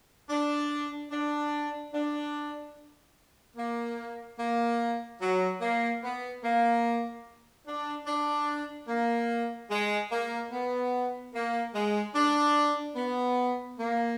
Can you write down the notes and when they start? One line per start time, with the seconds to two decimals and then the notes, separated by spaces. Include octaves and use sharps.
0.29 D4
1.11 D4
1.93 D4
3.56 A#3
4.38 A#3
5.20 F#3
5.61 A#3
6.02 B3
6.42 A#3
7.65 D4
8.05 D4
8.88 A#3
9.70 G#3
10.11 A#3
10.51 B3
11.33 A#3
11.74 G#3
12.14 D4
12.96 B3
13.78 A#3